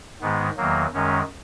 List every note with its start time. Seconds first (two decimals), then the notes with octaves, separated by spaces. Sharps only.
0.21 G#2 D#3 G#3 B3
0.57 E2 D#3 F#3 A#3
0.93 F#2 D#3 G#3 C#4